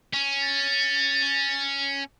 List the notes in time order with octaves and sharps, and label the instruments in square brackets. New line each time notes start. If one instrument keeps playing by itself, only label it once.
[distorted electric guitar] C#4
[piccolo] A6